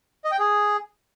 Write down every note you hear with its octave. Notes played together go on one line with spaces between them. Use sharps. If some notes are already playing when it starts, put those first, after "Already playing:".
D#5
G5
G#4